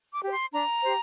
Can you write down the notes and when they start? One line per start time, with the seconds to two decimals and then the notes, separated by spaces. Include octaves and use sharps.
0.12 D6
0.23 G4 C5
0.32 C6
0.52 D4 A#5
0.82 G4 C5